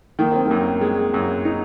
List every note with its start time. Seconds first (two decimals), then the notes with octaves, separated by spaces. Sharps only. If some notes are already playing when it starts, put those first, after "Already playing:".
0.19 D#3 A#3
0.32 C4
0.46 F#2 A#3
0.81 G#3
1.14 F#2
1.45 D#4